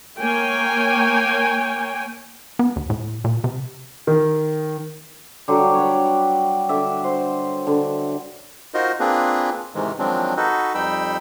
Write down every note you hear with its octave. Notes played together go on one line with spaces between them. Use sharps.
A#3 C#5 G5 G#5
B3
D#2
A2
A#2
C3
D#3
D3 F#3 G3 G4
B4 C#5
D6
D3 E5 D6
C5
D3
D#4 F4 F#4 A#4 C5 D#5
A#3 C4 D4 F4 G#4 B4
G#2 C3 D#3 E3 G#3
D#3 F3 F#3 G#3 C4 D4
D#4 F#4 A4 B4
F2 G3 D#4 G5 B5 E6